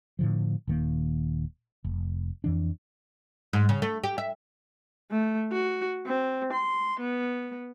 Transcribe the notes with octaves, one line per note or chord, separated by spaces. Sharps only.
A2 D3 F3
D#1 D#3 A#3
F1
F2 E3 D4
G#2
C#3
A3
G4
E5
A3
F#4
C4
C6
B3